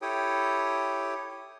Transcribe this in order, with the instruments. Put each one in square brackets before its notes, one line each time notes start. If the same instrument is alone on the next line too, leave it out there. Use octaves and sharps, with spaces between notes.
[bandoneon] E4 G4 A4 C#5 G5 D#6